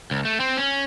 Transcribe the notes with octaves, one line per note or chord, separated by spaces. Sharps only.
C#2
A3
C4
C#4